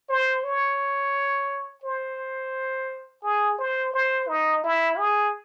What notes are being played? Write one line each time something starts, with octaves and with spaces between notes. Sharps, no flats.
C5
C#5
C5
G#4
C5
C5
D#4
E4
G#4